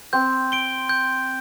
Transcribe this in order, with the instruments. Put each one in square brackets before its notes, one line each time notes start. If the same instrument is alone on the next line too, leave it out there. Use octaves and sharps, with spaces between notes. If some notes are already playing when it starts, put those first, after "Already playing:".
[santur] C4 [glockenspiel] G6
[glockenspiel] D7 G7
G6